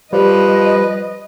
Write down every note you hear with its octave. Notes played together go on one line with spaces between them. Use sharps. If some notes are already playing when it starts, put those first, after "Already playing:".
F3 G3 B4 D#5